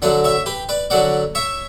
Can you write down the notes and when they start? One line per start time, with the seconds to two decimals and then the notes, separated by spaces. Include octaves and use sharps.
0.02 D3 F#3 A3 D5 F#5
0.24 C#5 E5
0.46 G4 B4
0.69 B4 D5
0.90 D3 F#3 A3 D5 F#5
1.35 C#5 E5